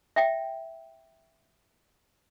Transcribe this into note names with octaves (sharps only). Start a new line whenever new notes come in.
E5 G5